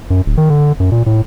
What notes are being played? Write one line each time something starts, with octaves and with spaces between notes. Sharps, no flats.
F#2
D1
D#3
D3
F#2
A#2
A2